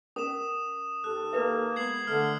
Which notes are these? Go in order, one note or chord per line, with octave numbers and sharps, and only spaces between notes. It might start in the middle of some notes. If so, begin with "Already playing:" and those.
C#4 A#4 D#6 E7
D#2 G4 A4 F#6
A#3 A#4 B4 E5
G#3 B3 G#6 C7 F#7
D3 A3 F6